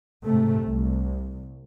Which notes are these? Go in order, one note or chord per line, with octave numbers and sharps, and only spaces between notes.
G#2 C3 A3
C2